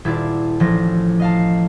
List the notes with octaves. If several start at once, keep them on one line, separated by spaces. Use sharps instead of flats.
D#1 E4 F4 D5 A5
A1 F3 A#6
D#5 F5 A5